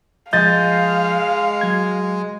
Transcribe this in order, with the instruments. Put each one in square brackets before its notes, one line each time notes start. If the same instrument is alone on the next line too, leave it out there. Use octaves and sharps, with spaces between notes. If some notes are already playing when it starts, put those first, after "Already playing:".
[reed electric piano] F3 G6 [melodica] G#3 [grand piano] D#5 A6 [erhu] F5
[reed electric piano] F#3 G#6